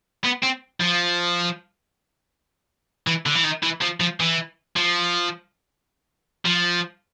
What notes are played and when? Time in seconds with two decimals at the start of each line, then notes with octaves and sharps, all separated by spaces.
0.25 B3
0.43 C4
0.81 F3
3.07 E3
3.26 D3
3.35 E3
3.44 D#3
3.63 E3
3.82 F3
4.00 F3
4.20 E3
4.76 F3
6.46 F3